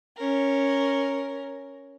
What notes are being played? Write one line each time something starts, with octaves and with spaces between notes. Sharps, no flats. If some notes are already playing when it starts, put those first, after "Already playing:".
C#4 A#4